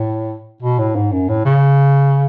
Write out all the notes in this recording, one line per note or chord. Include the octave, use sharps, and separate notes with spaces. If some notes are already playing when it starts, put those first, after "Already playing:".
Already playing: A2
B2
A2
G#2
F#2
A2
C#3